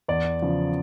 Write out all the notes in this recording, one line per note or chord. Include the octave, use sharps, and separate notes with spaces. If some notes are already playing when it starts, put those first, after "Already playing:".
E2 D5
C#3 F3